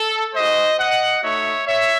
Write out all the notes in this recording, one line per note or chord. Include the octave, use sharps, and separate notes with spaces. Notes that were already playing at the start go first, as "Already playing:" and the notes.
Already playing: A4
G#3 D#4 F#4 C5 D#5
D#5 F#5
A3 D#4 F#4 C#5 E5
C#5 E5